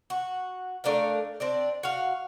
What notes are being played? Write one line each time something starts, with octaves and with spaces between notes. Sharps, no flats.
F#4
A3 D4 A#4 F5
C4 D4 D5
F#4 F5